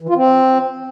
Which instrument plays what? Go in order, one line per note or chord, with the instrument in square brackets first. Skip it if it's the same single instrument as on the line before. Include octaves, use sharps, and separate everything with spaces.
[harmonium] E3
F4
C4